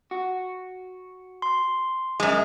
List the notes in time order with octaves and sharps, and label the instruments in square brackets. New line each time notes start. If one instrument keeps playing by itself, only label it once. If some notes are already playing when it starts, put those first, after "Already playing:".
[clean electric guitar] F#4
[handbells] C6
[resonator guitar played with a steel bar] F#2 G#3